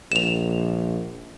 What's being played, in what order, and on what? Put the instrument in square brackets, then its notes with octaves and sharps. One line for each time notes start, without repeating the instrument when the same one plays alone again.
[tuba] A#1 [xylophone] E7 F7